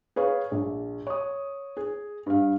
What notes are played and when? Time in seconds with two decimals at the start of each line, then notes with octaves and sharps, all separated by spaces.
0.16 G#4 B4 C#5 F5
0.51 A#1
1.07 C#5 D#6
1.77 G#4
2.26 G2 F5